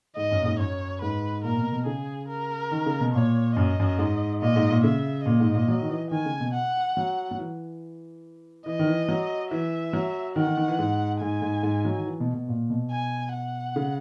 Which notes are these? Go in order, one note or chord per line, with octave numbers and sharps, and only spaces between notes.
G#2 D#5
F#2
A#2
G#2
F#2 C#5
G#2 B4
A#2 A#4
B2
B2
C#3 G#4
A#4
D#3
C#3
B2
A#2 C#5
F#2 D#5
F#2
G#2
A#2 D#5
G#2
A#2
C#3 E5
A#2 D#5
G#2
A#2
F#3
D#3
E3
D#3 G#5
C#3
B2
F#5
F#3
F#3
E3
E3 D#5
D#3
E3
F#3
E3 E5
F#3
D#3 F#5
D#3
D#3
E3
G#2
G#2 G#5
G#2
G#2
F#3
D#3
E3
B2
B2
A#2
B2
G#5
F#5
C#3